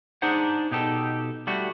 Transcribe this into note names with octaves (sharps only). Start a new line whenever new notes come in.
D4 D#4 G#4 C5 F#5
B2 D#4 G4 A4
G3 A3 F#4